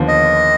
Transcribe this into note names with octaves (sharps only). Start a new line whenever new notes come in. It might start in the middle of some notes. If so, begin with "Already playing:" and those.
Already playing: D#2 D3 F3 B3
D#5